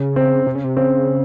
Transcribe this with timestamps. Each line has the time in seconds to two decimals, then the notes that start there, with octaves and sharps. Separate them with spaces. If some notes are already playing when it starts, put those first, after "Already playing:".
Already playing: C#3
0.16 C4
0.47 C3
0.55 C#3
0.64 C3
0.76 C#3 C4